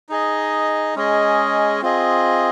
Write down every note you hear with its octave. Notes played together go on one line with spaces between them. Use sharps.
D#4 G#4 D#5
G#3 C#4 G#4 D#5
C4 F4 G#4 D#5